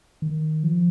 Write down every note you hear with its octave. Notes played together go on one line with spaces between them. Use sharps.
D#3
F3